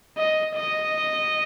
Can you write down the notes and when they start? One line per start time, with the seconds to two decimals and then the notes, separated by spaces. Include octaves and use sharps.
0.18 D#5
0.56 D#5